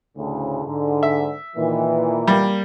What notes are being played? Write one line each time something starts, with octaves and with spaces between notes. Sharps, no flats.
D2 A2 C#3
G#2 D3
E5
A#2 D#3 E3
G3 A#3